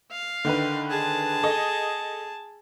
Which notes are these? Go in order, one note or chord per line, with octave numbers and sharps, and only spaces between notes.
F5
D3 D#3 B4
G#4 A5
A4 D#5